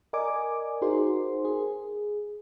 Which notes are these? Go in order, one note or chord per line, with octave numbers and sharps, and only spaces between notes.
A#4 D5 D#5 G#5 D6
D#4 F#4 G#4 A#4 C5 C6
G#4